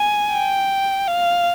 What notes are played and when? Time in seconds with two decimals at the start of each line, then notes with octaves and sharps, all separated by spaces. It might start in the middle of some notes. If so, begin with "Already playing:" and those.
Already playing: G#5
0.33 G5
1.08 F5